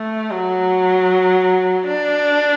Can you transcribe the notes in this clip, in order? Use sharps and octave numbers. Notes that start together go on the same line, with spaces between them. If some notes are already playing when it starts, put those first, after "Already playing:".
Already playing: A3
F#3
D4